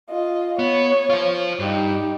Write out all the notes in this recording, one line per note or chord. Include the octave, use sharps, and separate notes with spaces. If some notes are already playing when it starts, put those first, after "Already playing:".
F4 D#5
B3 C#5
F4 C5
G2 D#4 G4